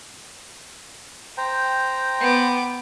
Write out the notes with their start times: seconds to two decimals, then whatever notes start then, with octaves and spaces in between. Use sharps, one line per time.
1.38 C5 G5 A#5
2.20 B3 D6